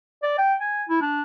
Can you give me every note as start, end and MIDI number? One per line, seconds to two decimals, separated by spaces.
0.23 0.35 74
0.38 0.54 79
0.61 0.83 80
0.89 1.00 64
1.02 1.23 62